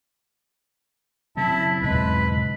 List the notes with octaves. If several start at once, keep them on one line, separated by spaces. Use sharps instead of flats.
C#3 F#3 C4 E4 A5
E2 G#2 B2 G#3 B4